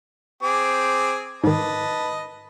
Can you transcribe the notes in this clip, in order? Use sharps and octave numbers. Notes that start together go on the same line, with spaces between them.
C4 G#4 D6
G#2 D#3 B4 D#5 A5